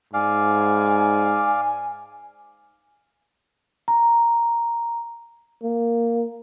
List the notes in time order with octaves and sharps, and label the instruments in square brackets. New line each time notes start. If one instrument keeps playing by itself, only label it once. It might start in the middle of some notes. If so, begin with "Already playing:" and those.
[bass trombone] G#2 [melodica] D5 F5 [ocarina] G#5
[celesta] A#5
[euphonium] A#3